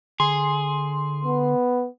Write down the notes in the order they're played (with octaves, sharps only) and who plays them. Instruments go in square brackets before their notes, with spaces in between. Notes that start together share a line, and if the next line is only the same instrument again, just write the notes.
[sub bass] D3 [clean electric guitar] G#4 [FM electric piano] C6
[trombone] B3